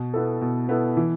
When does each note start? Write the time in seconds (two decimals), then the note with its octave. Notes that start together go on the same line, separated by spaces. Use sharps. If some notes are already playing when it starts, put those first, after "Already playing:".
Already playing: B2
0.14 B3 E4 A4
0.41 B2
0.69 B3 E4 A4
0.97 E3